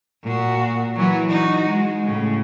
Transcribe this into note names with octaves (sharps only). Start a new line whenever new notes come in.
A#2 F#4
E3 F#3
D#4 F#4
G#3
A2 C#3